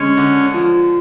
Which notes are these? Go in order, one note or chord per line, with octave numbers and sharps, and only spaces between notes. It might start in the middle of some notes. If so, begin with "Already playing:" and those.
Already playing: D3 G#3 C#4
D3
F3